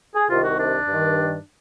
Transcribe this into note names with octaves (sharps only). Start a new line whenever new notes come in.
G#4
C2 C3 D#3 F4
F#4
D4
G2 D#3